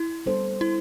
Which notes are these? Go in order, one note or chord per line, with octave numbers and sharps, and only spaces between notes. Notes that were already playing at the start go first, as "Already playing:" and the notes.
Already playing: E4
G3 B3 D4 A4 C5
E4